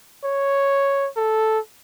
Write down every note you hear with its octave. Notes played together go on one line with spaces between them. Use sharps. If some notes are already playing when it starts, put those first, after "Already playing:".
C#5
A4